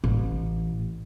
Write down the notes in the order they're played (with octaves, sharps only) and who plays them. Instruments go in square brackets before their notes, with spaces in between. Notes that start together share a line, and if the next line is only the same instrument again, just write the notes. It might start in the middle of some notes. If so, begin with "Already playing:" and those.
[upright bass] A1